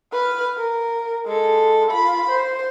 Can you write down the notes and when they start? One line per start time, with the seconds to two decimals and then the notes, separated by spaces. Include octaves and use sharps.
0.12 B4 F6
0.57 A#4
1.26 G#3 A4
1.91 F4 B5
2.30 C5